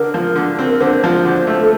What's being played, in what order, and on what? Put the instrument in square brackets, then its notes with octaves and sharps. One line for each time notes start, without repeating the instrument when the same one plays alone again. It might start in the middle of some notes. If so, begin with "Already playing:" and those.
Already playing: [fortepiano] D3 [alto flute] A#4
[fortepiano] F3
D3
C4
[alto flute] A#4
[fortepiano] D3 [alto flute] C5
[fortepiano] F3
D3
A3
[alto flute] A4